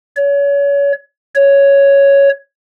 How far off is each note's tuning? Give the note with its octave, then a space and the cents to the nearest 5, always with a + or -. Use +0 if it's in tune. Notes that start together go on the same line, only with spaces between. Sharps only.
C#5 +30
C#5 +5